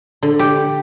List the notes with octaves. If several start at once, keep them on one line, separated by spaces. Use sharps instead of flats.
D3
G4